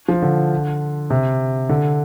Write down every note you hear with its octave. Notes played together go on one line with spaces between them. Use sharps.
F3
D3
C3
D3